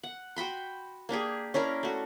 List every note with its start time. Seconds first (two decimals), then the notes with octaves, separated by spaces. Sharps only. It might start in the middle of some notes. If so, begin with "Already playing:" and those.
0.03 F#5
0.36 F#4 G5 B5 C6
1.09 A#3 D4 G4 G#4
1.54 C#4 D4 E4 A#4
1.83 A3 F#4